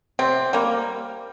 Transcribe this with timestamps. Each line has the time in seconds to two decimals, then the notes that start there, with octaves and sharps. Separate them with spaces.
0.19 C3 C4
0.53 G3 A#3